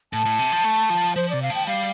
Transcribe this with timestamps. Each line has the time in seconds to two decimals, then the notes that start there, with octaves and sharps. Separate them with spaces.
0.13 A2 A5
0.26 A2
0.39 C3
0.52 F3
0.64 A3
0.90 F3
1.16 F3 C5
1.29 C3 D5
1.42 F5
1.50 F3 G5
1.67 G3 F5